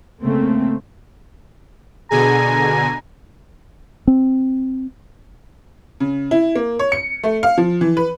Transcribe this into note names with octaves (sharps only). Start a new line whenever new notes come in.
C#3 A3 A#3 C4
B2 D3 G#4 G#5 A#5
C4
C#3
E4
A#3
C#5
C#7
A3
F5
F3
E3
B4